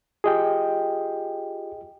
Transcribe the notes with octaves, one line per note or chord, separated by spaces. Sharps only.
F4 G4 G#4 D#5 G5